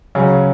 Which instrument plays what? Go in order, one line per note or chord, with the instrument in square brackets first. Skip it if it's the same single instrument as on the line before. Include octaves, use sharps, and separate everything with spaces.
[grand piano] C#3 F#3 C#4